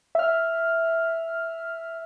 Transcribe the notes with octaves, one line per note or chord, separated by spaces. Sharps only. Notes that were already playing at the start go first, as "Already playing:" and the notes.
E5 F6